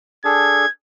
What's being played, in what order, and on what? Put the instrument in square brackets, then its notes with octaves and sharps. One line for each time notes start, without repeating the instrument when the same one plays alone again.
[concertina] D4 G#4 A4 [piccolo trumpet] G#6